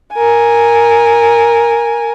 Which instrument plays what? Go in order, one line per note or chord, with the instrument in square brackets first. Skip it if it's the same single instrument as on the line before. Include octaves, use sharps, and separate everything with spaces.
[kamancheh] A#4 G#5